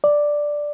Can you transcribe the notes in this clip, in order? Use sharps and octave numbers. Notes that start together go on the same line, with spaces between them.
D5